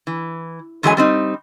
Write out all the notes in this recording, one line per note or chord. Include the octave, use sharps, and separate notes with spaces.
E3
F#2 E3 F#3 G#3 F#4 G#5
G3 C4 D#4